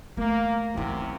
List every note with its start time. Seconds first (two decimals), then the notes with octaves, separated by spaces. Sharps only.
0.17 A3 A#3
0.74 F#2 C3 E3 E4